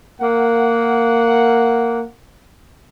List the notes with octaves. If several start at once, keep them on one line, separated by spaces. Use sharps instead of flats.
A#3 F#5